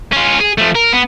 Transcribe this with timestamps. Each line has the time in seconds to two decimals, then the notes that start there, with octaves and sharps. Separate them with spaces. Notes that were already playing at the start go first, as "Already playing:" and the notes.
0.13 C#4 F4
0.40 G#4
0.58 F3 A3
0.75 A#4
0.93 B3